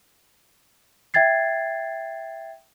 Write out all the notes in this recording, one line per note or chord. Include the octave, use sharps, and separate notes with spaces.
E5 G5 G#6 A6 C7